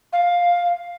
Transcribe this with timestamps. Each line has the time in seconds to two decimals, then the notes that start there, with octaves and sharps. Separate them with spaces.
0.13 F5